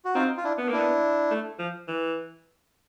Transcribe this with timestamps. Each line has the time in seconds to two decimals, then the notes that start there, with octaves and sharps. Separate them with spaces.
0.05 F#4
0.15 C4 D#4 F4
0.37 F4
0.44 D4 E4
0.58 B3
0.69 A#3 D4 E4
0.79 B3
1.31 A3
1.59 F3
1.88 E3